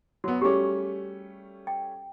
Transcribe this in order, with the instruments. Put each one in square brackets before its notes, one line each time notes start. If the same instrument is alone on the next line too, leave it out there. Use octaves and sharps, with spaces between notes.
[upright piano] F#3 B3 [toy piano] F#4
[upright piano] G3 A3 C#4 [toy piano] G4 G#4
[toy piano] G5